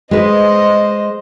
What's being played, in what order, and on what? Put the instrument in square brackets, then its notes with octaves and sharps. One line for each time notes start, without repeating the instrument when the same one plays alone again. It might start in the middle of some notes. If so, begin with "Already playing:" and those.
[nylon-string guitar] G#3 B4 [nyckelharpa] C5 D#5